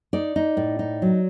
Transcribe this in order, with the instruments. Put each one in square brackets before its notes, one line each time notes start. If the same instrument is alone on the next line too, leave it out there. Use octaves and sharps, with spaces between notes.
[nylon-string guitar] D#4 D5
D#4
A2
D#4
F#3